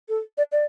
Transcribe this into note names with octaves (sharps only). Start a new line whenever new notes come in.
A4
D5
D5